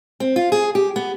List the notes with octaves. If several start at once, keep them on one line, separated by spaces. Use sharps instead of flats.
C4
F4
G#4
G4
B3